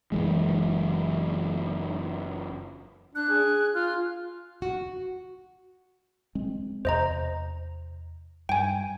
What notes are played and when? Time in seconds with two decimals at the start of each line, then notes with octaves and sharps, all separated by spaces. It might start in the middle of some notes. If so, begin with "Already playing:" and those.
0.12 F#1 E3 G#3
3.15 D4 F#6
3.30 G#4
3.75 F4 F6
4.62 F#4
6.35 G#3 C4
6.85 E2 C3 C5 D#5 A#5
8.49 G2 G5 G#5